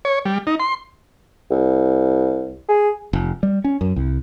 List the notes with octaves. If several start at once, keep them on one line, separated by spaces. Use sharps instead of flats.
C#5
G3
D#4
C6
C2
G#4
F1
G3
C#4
F#2
C2